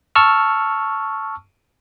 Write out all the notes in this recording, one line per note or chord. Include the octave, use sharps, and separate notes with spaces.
A5 C#6 E6 F6